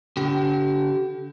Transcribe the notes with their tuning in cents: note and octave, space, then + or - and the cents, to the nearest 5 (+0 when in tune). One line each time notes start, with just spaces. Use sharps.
D3 -40 G4 -45